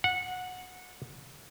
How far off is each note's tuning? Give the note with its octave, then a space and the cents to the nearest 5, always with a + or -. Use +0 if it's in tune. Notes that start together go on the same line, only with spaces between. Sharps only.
F#5 -15